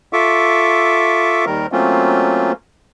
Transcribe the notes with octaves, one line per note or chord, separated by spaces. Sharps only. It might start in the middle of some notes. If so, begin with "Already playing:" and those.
F4 A4 E5 C#6 D6
D#2 D#3 G3 A#4
F#3 A3 A#3 C4 C#4 F4